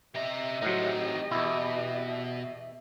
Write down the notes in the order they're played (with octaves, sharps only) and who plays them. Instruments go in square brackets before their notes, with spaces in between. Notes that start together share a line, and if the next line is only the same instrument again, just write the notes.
[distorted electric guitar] C3 A#5 [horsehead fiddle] G4 D#5 [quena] E5
[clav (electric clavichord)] A2 F#3 [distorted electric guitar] C4 D#4
[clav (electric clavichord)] E2 E4 [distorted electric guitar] B2 [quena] E5